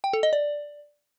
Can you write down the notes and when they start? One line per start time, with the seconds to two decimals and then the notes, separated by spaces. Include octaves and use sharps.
0.04 G5
0.13 A4
0.23 D#5
0.33 D5